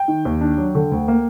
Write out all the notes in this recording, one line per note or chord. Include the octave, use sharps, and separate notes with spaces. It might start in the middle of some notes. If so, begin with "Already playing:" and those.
Already playing: G5
D#3
D#2
D4
F#3
D3
D2
A#3